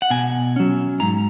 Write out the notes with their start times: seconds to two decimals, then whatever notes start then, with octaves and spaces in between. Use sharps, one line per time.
0.02 F#5
0.10 B2 G#5
0.56 F#3 C#4
1.00 G#2 A#5